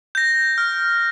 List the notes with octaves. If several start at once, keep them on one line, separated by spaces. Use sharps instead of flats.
G6 A#6
F6